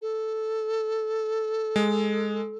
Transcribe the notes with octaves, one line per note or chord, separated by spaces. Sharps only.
A4
G#3